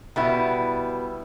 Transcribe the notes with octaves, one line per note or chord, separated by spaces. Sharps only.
B2 G3 B3 E4